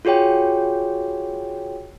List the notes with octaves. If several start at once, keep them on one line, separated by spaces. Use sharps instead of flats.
F4 F#4 G#4 C#5 G5